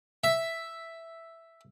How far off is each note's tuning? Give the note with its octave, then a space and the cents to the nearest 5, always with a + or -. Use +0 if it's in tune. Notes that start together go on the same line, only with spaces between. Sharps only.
E5 +0